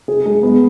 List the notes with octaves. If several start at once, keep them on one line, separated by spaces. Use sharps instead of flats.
G#4
G#3
B3